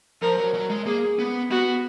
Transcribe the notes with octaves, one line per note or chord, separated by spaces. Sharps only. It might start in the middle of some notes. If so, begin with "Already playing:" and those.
F3 A#4
F#3
F#3
G#3
A#3 G#4
B3
B3 F#4